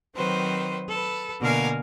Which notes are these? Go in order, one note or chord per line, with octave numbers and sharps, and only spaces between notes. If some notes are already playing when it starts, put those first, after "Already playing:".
D#3 F#3 C4 B4 C5
A4 B4
B2 D3 A#3 A#4 F5 G#5